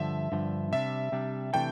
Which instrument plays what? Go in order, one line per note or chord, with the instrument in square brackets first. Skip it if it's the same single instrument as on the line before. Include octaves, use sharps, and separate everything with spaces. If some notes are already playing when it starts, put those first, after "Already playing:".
Already playing: [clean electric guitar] G2 D3 F3 [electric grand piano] E5
[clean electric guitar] G2 D3 F3
[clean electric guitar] C3 G3 D4 [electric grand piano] E5
[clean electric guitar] C3 G3 D4
[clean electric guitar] C3 E3 A3 D4 A4 [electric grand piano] G5